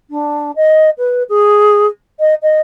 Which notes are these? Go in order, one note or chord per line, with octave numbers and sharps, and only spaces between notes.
D4
D#5
B4
G#4
D#5
D#5